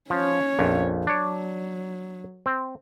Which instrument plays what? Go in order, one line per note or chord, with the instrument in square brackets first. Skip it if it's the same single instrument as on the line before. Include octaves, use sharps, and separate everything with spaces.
[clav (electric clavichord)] F3 [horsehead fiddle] C#4 C#5
[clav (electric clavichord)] A#1 F2
[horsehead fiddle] F#3 [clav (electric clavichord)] D4 C#5
[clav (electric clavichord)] C4